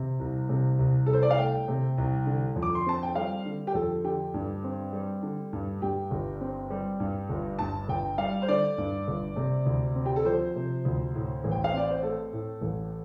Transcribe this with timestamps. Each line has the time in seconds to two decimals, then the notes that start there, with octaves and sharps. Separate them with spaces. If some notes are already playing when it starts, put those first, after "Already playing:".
Already playing: C3
0.19 C2
0.49 C3
0.79 C2
1.06 C2 A4
1.13 C5
1.23 D5
1.31 F5
1.38 A3 G5
1.68 C3
1.98 C2
2.26 D3
2.56 F2
2.62 D6
2.75 C6
2.86 C4 A5
3.03 G5
3.15 G3 F5
3.45 D3
3.67 G4
3.74 F2 A4
4.04 D3 G4
4.34 G2
4.64 C4
4.93 G3
5.22 D3
5.53 G2
5.82 G2 G4
6.11 G1
6.41 C4
6.70 G3
7.00 G2
7.29 G1
7.59 G2 A5
7.88 G1 G5
8.18 G3 F5
8.42 C5
8.48 D3 D5
8.78 G2
9.08 G1
9.36 C3
9.66 D2
9.96 C4
10.06 G4
10.16 A4
10.25 F3 C5
10.55 C3
10.85 D2
11.15 A2
11.44 A1
11.51 G5
11.64 F5
11.74 C4 D5
11.90 C5
12.02 A3 A4
12.33 A2
12.61 A1